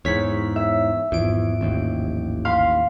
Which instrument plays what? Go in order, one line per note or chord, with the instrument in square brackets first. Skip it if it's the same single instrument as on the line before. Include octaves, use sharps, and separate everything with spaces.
[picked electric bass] E2 G#2 [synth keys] C#5 B6
[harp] E5
[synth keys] G#1 F3 D7 [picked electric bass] E2
[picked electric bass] A1 D#2
[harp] F5 B5 C6